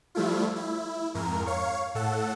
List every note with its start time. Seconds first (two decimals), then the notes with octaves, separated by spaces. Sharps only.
0.15 F3 G3 A3 E4 F4
0.56 E4
1.14 F2 G#2 A#4
1.46 C#5 F5 C#6
1.95 A2 A4 F#5